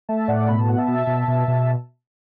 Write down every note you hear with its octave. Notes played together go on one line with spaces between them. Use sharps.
A3 E5 A5
A2 D5 F#5
B2 B5
A5
B3 F#5
E5 A5
B2
B2
B2
B2